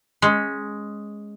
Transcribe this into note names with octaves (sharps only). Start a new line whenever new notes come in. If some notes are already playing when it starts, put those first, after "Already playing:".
G#3 C#4